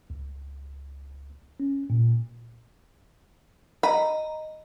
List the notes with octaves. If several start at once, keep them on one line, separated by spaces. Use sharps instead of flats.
C#2
C#4
A#2
D#5 A#5 B5